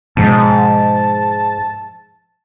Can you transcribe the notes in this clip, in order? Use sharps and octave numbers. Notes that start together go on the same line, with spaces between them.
G#2 B2 F3 G#3 A5